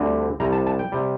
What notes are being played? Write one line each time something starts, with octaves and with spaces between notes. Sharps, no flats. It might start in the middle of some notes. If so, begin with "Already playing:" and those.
Already playing: D2 D3 G3 C4
C2 C3 G3 A#5
A5
A5
G5
C3 G3